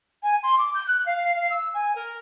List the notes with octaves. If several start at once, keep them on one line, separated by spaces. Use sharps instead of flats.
G#5
C6
D6
G6
F#6
F5
F5
E6
G#5
A#4